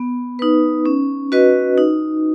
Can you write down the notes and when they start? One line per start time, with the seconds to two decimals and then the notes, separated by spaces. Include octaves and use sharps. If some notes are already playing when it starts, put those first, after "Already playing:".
Already playing: B3
0.39 D#4 B4
0.86 C#4
1.32 F#4 B4 D#5
1.78 D#4